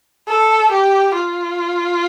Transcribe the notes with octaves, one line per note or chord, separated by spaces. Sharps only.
A4
G4
F4